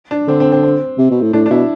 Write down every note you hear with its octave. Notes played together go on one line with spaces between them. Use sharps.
D4
D3 C4
C4
C4
C4
C3
B2
A2
A2 D4
D4
B2 E4